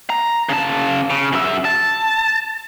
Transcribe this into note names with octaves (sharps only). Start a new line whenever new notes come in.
A#5
C#3 A5
C#3
F#2 E5
A5